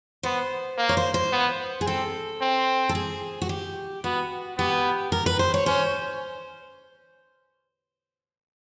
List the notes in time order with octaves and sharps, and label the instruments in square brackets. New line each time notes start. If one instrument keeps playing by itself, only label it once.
[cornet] B3 [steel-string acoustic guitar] C5
[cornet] A#3
[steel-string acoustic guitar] C#5
C5
C5
[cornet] B3
[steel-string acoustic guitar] G#4
[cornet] C4 [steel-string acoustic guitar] A4
[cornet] C4
[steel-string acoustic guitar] A4
G#4
F#4
G4
[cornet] B3 [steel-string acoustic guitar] F#4
[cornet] B3 [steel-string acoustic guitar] G4
[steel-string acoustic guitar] A#4
B4
C5
C#5
[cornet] C#4 [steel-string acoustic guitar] C5